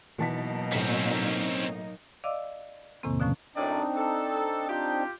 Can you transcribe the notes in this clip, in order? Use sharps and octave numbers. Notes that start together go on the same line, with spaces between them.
B2 E3 F#3 A#3 D#4 A5 B6
A2 C4 C#4 B6
D5 D#5 F5 D6 E6
E2 A2 C3 D#3 A#3 C4
B2 D3 F3 A3 C#4
F#2 A2 C4 D4 D#4 D5
A4
F4 G4